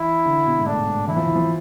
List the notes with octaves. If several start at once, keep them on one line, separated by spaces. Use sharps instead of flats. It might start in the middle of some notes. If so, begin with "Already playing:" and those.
Already playing: E3 E4
D3
B2
G#2
A2 D4
G#2
E3 E4
F3
E3
F3